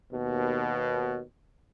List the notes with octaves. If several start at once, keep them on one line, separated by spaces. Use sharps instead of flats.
D#2 B2